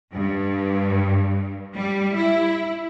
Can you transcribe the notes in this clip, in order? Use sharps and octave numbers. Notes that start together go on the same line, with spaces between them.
G2
G3
E4